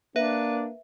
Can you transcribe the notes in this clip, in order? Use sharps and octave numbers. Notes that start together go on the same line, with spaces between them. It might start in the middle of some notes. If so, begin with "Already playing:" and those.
A#3 D4 B4 E5